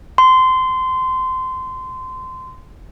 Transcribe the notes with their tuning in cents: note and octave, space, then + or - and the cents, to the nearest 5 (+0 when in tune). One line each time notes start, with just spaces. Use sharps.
C6 -20